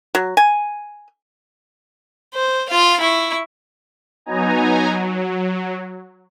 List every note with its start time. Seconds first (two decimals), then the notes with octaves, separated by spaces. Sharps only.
0.15 F#3
0.37 G#5
2.34 C5
2.69 F4 F5
3.00 E4 C#6
4.26 F#3 B3 D#4 G#5 A#5
4.89 F#3